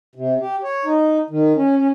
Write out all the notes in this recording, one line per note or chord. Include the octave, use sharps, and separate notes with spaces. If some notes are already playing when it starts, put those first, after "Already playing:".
C3
G4
C#5
D#4
D#3
C#4
C#4